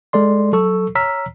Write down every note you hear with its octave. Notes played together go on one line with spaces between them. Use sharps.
G#3 A4 D5 C6
F#3 A4 C#6 E6
C#5 A#5 E6 F6 B6